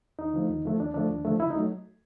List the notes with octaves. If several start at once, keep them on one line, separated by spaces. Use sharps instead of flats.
D#2 D#4
D3 F3 A3
D#2
D3 F3 A3
D#2 D4
D3 F3 A3 D4
D#2
D3 F3 A3
C#2 E4
D#4
F#3 A3